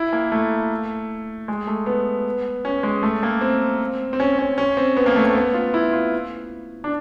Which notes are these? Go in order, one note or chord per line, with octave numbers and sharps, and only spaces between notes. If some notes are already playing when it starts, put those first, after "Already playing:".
Already playing: E4
A#3
A3
G#3
A3
B3
C#4
G#3
A3
A#3
C4
C4
C#4
C#4
C#4
C4
B3
A#3
A3
A#3
B3
F4
E4
F4
D4